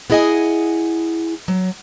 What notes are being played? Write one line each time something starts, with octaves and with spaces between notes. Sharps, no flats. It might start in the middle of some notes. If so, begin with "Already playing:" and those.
B3 E4 G#4 D#5 F#5 G#5
F#3